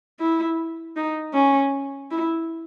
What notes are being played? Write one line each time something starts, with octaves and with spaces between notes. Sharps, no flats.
E4
D#4
C#4
E4